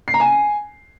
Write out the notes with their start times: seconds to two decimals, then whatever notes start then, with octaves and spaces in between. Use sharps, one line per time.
0.08 C7
0.14 A#5
0.20 G#5